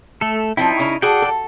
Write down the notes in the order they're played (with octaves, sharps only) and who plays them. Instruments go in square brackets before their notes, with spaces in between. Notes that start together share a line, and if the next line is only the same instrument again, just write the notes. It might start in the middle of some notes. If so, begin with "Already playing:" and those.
[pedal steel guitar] A3 A4
[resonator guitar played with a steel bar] F3 C4 G5 [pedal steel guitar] D#4 E4
[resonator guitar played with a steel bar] C#3 C#4
[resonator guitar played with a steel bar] F#4 G#4 A4 [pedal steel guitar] D5 F#5 G5
[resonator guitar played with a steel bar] A4